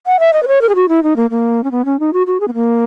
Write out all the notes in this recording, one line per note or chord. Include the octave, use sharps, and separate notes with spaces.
F#5
E5
D#5
B4
C#5
A#4
G#4
F#4
E4
D#4
A#3
A#3
C#4
B3
C#4
D#4
F#4
F#4
G#4
B3
A#3